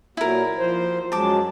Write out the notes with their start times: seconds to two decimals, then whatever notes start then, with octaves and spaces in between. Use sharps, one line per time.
0.17 A#2 F#3 E4 A#4
0.58 F3 C5
1.12 F#2 F#3 G#3 A5 D6